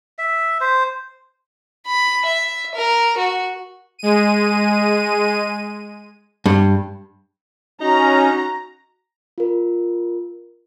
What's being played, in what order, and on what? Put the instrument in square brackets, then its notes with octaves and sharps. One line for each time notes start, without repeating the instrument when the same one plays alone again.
[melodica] E5
C5
[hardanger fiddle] B5
E5
A#4
F#4
[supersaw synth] G#3 D#7
[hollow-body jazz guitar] G2
[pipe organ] C#4 [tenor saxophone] D#4 [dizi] F#4 [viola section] A#5
[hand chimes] F4 A#4